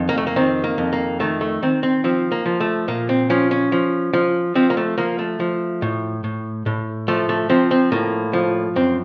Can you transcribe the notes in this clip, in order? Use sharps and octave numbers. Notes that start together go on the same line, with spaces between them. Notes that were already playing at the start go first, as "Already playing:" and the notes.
Already playing: F2 D#3
A#3
A3
A#3
D#3 C4
A#3
F2
A#3
D#3 A3
A3
D#3 C4
C4
F3 C4
A#3
F3
A3
A#2 A#3
C4
F3 C#4
C#4
F3
F3
F3 C4
A#3
A3
F3 A#3
A3
F3
A2
A2
A2
F3 A3
A3
F3 C4
C4
A2 A#3
F3
F#2 C4